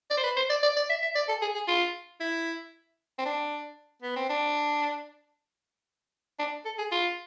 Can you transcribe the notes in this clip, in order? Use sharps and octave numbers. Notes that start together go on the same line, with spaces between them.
D5
C5
B4
C5
D5
D5
D5
E5
E5
D5
A4
G#4
G#4
F4
E4
C4
D4
B3
C4
D4
D4
A4
G#4
F4